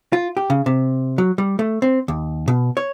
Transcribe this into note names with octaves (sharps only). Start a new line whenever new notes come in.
F4
G4
C#3
C3
F#3
G3
A3
C4
D#2
B2
C#5